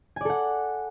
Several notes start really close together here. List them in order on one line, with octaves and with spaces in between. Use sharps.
G#5 D5 A4 F#5